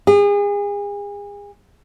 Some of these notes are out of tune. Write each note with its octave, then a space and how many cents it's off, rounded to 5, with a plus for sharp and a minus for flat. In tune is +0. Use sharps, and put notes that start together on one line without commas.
G#4 -35